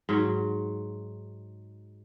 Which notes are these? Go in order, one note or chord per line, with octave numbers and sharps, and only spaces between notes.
G#2 F#3